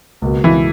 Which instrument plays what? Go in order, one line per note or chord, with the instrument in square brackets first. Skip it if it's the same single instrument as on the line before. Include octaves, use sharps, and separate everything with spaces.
[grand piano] C#2 B2 A#3
[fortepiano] E3